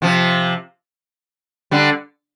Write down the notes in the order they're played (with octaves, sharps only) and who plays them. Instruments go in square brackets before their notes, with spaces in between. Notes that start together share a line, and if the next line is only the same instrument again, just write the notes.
[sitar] C3 F3
D3 G3